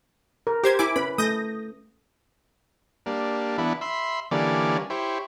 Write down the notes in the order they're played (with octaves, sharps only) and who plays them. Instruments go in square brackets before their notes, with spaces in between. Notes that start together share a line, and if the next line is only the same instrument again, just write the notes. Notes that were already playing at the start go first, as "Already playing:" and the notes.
[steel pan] A#4
[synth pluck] G4 C5 G#6
E4 G#5 D6
[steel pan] C#4 B4 [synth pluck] B5
[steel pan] A3 [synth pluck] D#6 G6 A#6
[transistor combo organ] G3 A#3 D4
E3 B3 D4 E4
E5 B5 C6
D3 E3 G3 A#3 C#4 D5
E4 G4 C5 C#5